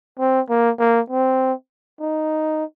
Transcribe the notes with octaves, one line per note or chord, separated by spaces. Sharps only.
C4
A#3
A#3
C4
D#4